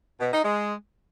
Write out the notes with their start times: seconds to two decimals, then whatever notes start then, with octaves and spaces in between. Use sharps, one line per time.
0.20 B2
0.32 D#4
0.43 G#3